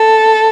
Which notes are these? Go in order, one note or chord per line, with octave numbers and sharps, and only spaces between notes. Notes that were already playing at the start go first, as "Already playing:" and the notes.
Already playing: A4